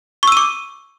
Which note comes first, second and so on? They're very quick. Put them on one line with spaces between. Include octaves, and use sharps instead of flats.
C#6 E6 D#7 D6